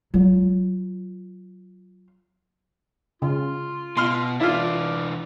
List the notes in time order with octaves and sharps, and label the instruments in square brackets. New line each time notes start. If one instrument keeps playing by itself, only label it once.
[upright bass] F#3 F4
[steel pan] C#3 [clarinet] F4
[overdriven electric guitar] B2 [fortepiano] C6 F6
[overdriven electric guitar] E3 D4 [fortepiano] E4 F4 [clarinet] D5